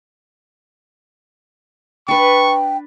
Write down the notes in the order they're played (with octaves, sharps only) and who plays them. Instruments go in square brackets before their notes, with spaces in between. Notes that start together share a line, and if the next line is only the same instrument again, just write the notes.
[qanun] D4 B4 [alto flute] G5 [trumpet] C#6